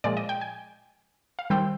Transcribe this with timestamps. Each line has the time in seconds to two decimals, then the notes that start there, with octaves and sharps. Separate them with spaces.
0.04 A#2 F3 G#3 D5
0.17 D#5
0.29 G5
0.41 G#5
1.39 F5
1.50 D#3 G3 C4 G5